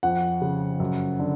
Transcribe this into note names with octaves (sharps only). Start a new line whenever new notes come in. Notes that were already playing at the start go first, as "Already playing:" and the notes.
F2 F#5
C#3
F#2
D3